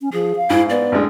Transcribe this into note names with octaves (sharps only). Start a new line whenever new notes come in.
C#4
F3 G#4
F5
G#2 E4
B3 D5
A1 D3 G#3